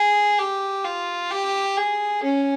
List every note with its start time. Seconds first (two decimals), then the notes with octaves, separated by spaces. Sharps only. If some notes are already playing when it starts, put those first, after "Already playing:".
Already playing: G#4
0.39 G4
0.85 F4
1.31 G4
1.77 G#4
2.23 C#4